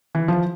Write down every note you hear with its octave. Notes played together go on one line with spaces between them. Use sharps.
E3
F3